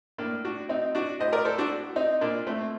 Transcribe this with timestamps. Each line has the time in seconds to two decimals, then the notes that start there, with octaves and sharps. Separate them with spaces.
0.18 A2 A#3 D4
0.45 D4 F#4
0.69 C4 D#4
0.95 D4 F#4
1.20 A2 C5 D#5
1.33 A#4 D5
1.45 A4 C5
1.58 D4 F#4
1.96 C4 D#4
2.21 A#2 A#3 D4
2.47 A3 C4